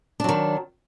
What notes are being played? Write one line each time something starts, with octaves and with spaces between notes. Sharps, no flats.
D#3 F#3 D4